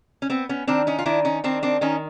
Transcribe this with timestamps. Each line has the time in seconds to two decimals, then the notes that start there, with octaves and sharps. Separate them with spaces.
0.22 C#4
0.30 B3 C4
0.49 B3 C#4
0.67 D#3 C4 D4
0.87 C#4 D#4
0.99 F4
1.06 D#3 D4 E4
1.25 C#4 D#4
1.44 D#3 C4 D4
1.63 C4 D4
1.81 D#3 C#4 D#4